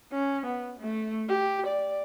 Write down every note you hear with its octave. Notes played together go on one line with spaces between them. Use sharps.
C#4
B3
A3
G4
D5